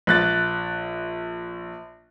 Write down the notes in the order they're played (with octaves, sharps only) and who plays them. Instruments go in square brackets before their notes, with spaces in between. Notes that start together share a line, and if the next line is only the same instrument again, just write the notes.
[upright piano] A#1 F#6 A6